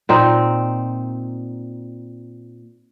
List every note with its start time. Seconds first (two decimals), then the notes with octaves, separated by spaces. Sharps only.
0.09 A#2 C4 D#4